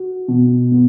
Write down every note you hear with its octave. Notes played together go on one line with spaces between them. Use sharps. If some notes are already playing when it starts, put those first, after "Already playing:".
Already playing: F#4
B2
B3